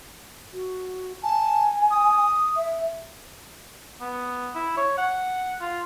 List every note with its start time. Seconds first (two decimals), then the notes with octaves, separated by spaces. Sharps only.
0.54 F#4
1.23 G#5 A5
1.90 D#6
2.57 E5
4.01 B3
4.55 E4
4.77 C#5
4.98 F#5
5.61 F4